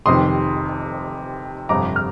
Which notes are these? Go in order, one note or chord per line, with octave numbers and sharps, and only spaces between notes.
F1 F2 C3 D#3 C6 D#6
G1 F2 C3 A#5 D6
F6